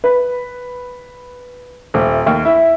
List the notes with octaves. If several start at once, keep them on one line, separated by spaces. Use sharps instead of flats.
B4
D#1
D#2
E4